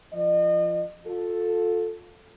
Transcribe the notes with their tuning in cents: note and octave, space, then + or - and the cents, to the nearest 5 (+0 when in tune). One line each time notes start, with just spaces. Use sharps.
F3 -15 D#5 -35
F4 +30 A4 +0